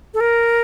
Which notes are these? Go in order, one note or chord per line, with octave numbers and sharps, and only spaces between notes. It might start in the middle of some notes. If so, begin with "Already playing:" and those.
A4
A#4